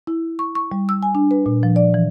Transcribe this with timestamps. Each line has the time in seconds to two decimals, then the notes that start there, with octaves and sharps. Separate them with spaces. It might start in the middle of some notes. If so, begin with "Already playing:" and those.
0.07 E4
0.39 C#6
0.55 C#6
0.72 G3
0.89 E6
1.03 G#5
1.15 D4
1.31 B4
1.46 A#2
1.63 F3
1.76 D5
1.94 E3